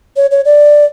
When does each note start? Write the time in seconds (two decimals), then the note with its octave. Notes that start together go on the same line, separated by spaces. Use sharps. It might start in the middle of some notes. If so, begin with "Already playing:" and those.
0.17 C#5
0.31 C#5
0.45 D5